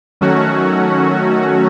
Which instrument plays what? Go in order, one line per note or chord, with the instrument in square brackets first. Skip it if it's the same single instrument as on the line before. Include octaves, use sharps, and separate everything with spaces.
[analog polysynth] D#3 F#3 A3 C#4 F#4